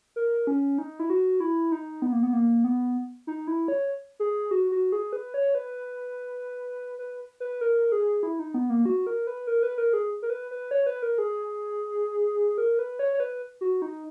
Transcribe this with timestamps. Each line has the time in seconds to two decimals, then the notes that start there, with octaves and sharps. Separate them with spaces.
0.16 A#4
0.47 C#4
0.78 D#4
0.99 E4
1.10 F#4
1.40 E4
1.72 D#4
2.02 B3
2.12 A#3
2.23 B3
2.33 A#3
2.64 B3
3.27 D#4
3.47 E4
3.68 C#5
4.20 G#4
4.51 F#4
4.72 F#4
4.92 G#4
5.13 B4
5.34 C#5
5.55 B4
6.99 B4
7.40 B4
7.61 A#4
7.92 G#4
8.23 E4
8.39 D#4
8.54 B3
8.70 A#3
8.86 F#4
9.07 A#4
9.27 B4
9.47 A#4
9.63 B4
9.78 A#4
9.93 G#4
10.22 A#4
10.30 B4
10.51 B4
10.71 C#5
10.86 B4
11.02 A#4
11.18 G#4
12.58 A#4
12.79 B4
12.99 C#5
13.14 C#5
13.20 B4
13.61 F#4
13.82 D#4